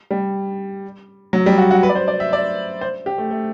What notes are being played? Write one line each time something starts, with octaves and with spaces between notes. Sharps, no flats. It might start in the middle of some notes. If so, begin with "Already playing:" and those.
G3
F#3
G3
F#4
F#4
B4
D5
C5
D5
E5
D5
C5
G4
A3
A3